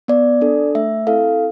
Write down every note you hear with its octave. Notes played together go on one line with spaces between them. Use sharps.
B3 D5
D4 A4
A3 E5
C4 E4 A4 F5